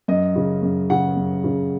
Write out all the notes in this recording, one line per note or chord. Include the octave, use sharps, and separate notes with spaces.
F#2 D#5
C#3
F#2
C#3 F#5
F#2
C#3